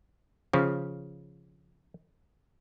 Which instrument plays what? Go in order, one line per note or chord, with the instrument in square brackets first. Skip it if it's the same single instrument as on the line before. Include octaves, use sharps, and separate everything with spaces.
[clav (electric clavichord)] C#3 F3